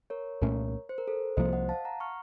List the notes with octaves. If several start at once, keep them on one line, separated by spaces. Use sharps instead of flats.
A#4 C#5
C2 A#2 A3 C#4 A#4 C#5
C5
A#4
A4 C5
C2 C3 F3 A#3 C5 D#5
D#5 F#5
F5 A5
F#5 A#5
C#6 F6